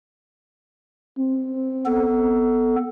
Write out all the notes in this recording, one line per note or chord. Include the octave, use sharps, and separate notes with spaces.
C4
B3 A4